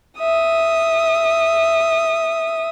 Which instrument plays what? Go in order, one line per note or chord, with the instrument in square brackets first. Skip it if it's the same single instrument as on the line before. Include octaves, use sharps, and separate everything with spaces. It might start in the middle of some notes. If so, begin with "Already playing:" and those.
[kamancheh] E5 D#6